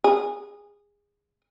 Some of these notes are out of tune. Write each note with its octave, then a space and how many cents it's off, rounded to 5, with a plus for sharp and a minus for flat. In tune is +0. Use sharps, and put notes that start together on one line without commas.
G#4 -20